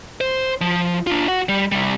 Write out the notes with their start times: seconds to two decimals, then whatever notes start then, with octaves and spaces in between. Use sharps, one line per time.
0.21 C5
0.61 F3
1.07 D4 F4
1.28 F#4 F#5
1.49 G3
1.72 C3 G3